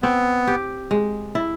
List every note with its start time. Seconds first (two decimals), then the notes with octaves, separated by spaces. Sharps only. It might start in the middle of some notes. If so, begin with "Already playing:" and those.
0.02 B3 C4
0.47 G4
0.91 G#3
1.35 E4